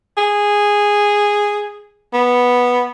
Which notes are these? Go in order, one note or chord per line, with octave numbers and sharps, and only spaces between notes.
G#4
B3